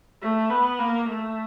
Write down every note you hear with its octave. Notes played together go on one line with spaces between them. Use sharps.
A3
B3
A#3
A3